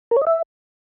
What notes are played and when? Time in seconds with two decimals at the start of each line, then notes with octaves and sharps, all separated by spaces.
0.11 A#4
0.16 C#5
0.22 D#5
0.27 E5